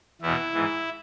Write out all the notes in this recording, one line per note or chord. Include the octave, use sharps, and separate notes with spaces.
E2 B2 E4
G#2 E3